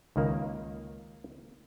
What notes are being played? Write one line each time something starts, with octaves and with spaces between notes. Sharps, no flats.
C#2 D#3 A#3